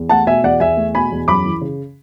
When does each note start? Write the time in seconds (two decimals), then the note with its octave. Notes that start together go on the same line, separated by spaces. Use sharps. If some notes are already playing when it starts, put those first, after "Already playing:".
Already playing: E2
0.09 A3 F#5 A5
0.27 B2 E5 G#5
0.44 E2 D5 F#5
0.60 E2 E5 G#5
0.77 A3
0.95 B2 G#5 B5
1.12 E2
1.28 F#2 B5 D6
1.46 E3
1.61 C#3